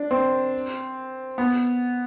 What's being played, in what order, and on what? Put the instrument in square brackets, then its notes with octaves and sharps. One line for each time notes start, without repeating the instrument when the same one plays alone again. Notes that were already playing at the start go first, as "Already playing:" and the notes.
Already playing: [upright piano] D4
C4
B3